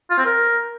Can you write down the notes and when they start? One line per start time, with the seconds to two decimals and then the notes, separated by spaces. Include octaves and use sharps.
0.10 F4
0.18 C4
0.25 A#4